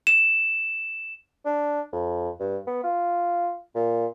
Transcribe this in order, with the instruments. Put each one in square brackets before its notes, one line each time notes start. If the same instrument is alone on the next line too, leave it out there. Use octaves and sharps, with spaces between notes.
[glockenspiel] E7
[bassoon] D4
F2
G2
B3
F4
A#2